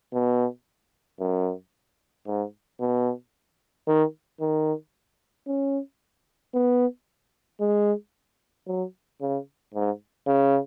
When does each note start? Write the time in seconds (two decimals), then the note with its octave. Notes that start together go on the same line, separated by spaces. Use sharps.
0.14 B2
1.20 F#2
2.27 G#2
2.80 B2
3.87 D#3
4.41 D#3
5.47 C#4
6.54 B3
7.61 G#3
8.68 F#3
9.21 C#3
9.74 G#2
10.27 C#3